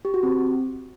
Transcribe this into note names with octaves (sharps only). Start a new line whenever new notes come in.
G4
F#4
C4